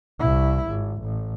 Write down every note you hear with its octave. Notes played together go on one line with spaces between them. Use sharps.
C2 E4
G#1
A1